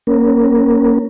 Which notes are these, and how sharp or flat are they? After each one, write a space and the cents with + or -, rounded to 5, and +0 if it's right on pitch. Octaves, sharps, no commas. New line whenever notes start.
A#3 +0 C#4 +0 A#4 +0